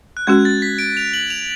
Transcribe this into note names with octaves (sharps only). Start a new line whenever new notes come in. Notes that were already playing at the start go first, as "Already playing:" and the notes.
F#6
G#3 C#4 F#4 G#6
A6
B6
D7
F7
F#7
F7